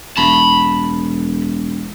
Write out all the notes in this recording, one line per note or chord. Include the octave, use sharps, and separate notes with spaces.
E1 A5 B5